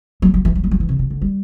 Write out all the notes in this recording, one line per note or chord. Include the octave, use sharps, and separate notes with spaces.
F#3
F#3
E3
F#3
G3
F#3
E3
C3
C3
D3
G3